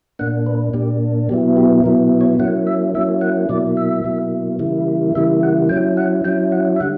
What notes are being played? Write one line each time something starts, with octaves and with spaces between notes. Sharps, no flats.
A#2 A#3 D4 F#5
B4
A#2 A#3 D4 G4
B2 F#3 B3 E4 G4
G4
B2 F#3 B3 E4 A#4
C#5
F#3 A#3 C#4 E4 F#5
E5
F#3 A#3 C#4 E4 E5
F#5
B2 F#3 A#3 E4 D5
E5
B2 F#3 A#3 E4
C#3 E3 G3 A#3 E4
C#3 E3 G3 A#3 E4 E5
F#5
F#3 C#4 E4 G5
F#5
F#3 C#4 E4 G5
F#5
E5
D3 G3 F#5